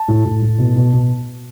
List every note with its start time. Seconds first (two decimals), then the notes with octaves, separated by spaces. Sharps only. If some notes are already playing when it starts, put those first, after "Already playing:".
Already playing: A5
0.08 A2
0.25 A2
0.42 A2
0.58 B2
0.76 B2
0.93 B2